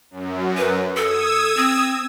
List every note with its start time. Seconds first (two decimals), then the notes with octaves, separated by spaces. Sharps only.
0.11 F#2
0.58 B4
0.97 A4 D#6 E6 G#6
1.57 C4